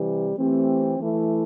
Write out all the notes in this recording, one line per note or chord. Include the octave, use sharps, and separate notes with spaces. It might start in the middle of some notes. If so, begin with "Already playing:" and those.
Already playing: C3 E3 G3
E3 A3 C4 G4
E3 A3 E4